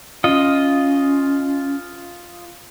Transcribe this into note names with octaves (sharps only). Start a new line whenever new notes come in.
C#4 F4 D#5